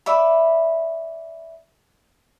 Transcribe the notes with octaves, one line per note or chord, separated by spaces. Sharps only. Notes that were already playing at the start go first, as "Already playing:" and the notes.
D5 E5 B5